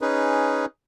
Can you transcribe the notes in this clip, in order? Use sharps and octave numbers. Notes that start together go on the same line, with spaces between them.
C#4 D#4 G#4 B4